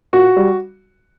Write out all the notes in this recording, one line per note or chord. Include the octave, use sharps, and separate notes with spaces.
A#2 F#4
G3